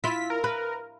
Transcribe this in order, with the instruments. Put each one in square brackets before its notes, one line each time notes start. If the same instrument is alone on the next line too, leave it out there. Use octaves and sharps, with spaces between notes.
[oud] E4 F4 [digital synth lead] B6
[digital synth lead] A#4
[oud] B4